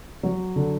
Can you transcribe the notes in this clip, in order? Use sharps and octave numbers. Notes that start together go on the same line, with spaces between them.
F#3
D3